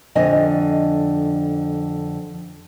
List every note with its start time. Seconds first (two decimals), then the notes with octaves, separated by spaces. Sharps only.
0.15 F2 D3 D#5 G#5